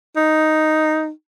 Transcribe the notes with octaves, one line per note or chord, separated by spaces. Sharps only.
D#4